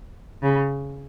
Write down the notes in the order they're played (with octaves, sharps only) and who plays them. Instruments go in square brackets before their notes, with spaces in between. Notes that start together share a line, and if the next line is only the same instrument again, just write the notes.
[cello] C#3